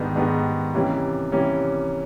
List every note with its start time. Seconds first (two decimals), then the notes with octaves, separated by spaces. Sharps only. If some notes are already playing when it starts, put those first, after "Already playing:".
Already playing: G#2 D#3 G3 B3 D4
0.16 G#2 D#3 G3 B3 D4
0.74 C3 E3 G3 A#3 C#4
1.32 C3 E3 G3 A#3 C#4